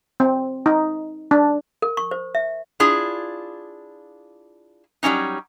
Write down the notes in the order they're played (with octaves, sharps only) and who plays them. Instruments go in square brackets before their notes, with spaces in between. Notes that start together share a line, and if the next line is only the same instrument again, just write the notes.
[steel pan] C4
D#4
D4
[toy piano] A#4
C#6
C5
E5
[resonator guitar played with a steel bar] D4 E4 F4 G#4
F#3 G3 A#3 C#4 D#4